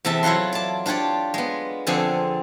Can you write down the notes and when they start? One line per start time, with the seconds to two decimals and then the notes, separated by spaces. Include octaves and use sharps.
0.05 E2 C3 A4 E5 G5 A5
0.23 F#3 E4 F4 F#5 C6
0.53 D5 A5
0.86 D4 F4 G4 C#5 D5
1.34 G#3 B3
1.87 F2 D3 C4 G#4 D5 G#5